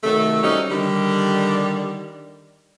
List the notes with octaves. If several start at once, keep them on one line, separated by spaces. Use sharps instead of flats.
C3 D#3 F#3 A3
F#3 G3 C4 C#4 D#4
D3 D#3 G3